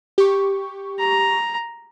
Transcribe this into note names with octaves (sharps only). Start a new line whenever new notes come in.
G4 C#6
A#5